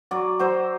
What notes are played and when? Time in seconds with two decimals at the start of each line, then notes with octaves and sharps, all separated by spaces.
0.11 F#3 D5
0.39 F#3 C5